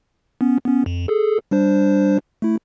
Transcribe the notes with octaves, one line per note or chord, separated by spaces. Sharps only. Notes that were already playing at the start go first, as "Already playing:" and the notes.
B3 C#4
B3 C#4
F2
G#4 A4
G3 D4 C5
A3 E4